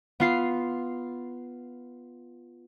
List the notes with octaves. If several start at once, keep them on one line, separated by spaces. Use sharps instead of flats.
B3 F4 C7